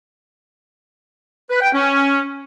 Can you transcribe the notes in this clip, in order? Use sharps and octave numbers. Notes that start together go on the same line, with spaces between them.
B4
G5
C#4